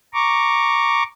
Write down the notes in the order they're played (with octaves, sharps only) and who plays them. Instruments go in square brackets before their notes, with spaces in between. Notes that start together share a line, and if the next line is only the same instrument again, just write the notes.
[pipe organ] A#5 C#6 D6